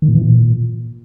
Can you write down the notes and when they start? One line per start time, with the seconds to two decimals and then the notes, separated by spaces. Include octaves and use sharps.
0.02 D#3
0.09 A#2
0.15 E3
0.22 A#2